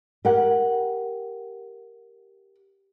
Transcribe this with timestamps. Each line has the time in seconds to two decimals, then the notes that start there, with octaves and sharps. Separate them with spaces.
0.25 G4 A#4 F#5